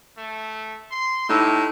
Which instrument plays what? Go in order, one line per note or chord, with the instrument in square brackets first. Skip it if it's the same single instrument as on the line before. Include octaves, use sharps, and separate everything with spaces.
[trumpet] A3
C6
[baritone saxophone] A2 [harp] D#4 [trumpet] G4 [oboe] E6